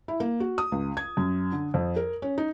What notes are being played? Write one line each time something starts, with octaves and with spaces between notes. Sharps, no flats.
E4
A#3
F#4
D#6
C#2
G#6
F#2
D3
F2
A#4
C#4
D#4